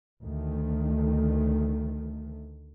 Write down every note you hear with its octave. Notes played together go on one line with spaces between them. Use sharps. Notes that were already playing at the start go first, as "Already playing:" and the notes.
D2 D#3 A3